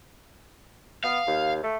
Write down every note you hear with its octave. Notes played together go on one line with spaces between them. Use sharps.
B3 F5
D#2
A3